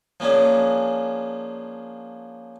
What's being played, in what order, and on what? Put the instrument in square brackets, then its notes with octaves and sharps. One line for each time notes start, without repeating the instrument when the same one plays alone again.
[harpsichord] F3 A#3 C#4 D4 G#4